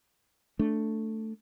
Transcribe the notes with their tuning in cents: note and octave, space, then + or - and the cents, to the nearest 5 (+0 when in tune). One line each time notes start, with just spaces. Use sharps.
A3 +5 D4 +0